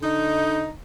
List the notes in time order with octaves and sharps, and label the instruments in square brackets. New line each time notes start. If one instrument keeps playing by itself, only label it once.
[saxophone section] D3 D#4